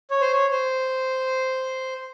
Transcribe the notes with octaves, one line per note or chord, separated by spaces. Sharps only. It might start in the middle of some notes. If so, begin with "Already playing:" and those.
C#5
C5
C#5
C5